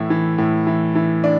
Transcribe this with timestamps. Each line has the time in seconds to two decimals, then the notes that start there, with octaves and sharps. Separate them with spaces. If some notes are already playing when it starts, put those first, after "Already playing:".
Already playing: A2 E3 E4
0.10 E3
0.38 A2
0.67 E3
0.95 E3
1.24 D4